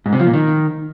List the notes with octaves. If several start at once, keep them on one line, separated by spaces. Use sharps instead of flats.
G#2
C3
F3
A#2
D#3